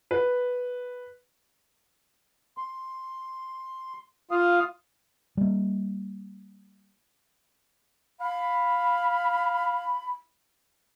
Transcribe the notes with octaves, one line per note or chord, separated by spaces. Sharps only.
B4
C6
F4 F5 D#6
G3 A#3
F5 B5